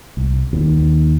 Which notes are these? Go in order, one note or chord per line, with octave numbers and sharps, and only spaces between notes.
C2
D#2